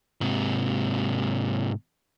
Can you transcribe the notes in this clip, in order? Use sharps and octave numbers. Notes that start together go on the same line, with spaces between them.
G#2 C3